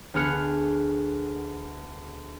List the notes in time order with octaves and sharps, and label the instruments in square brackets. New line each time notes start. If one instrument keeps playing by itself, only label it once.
[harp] D2 B3 G#4 F6 C#7